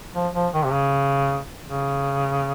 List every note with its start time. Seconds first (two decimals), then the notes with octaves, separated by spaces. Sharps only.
0.15 F3
0.34 F3
0.54 D#3
0.65 C3
0.72 C#3
1.69 C#3